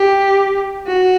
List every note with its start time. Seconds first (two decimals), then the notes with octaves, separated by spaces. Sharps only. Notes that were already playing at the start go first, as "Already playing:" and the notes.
Already playing: G4
0.87 F#4